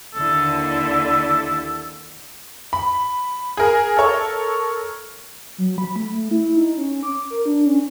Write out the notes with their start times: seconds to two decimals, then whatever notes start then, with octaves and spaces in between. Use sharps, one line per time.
0.14 D#2 D3 E4 A4
2.73 B5
3.57 G#4 A#4
3.97 A4 A#4 C#5
5.58 F#3
5.78 B5
5.96 A3
6.14 A3
6.31 E4
6.57 D#4
6.77 C#4
7.03 D6
7.30 A#4
7.46 D4
7.66 C#4